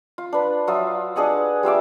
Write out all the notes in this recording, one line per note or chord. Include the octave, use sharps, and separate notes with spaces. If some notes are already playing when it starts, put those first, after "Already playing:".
F4
D4 B4
F#3 F4 E5 D#6
D4 G#4 D#5 F#5
G3 F4 E5 D6